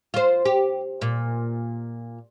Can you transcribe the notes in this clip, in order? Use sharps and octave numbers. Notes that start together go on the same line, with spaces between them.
F4 C5
G4
A#2